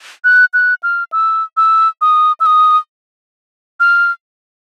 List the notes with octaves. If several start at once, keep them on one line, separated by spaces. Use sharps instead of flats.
F#6
F#6
F6
E6
E6
D#6
E6
D#6
F6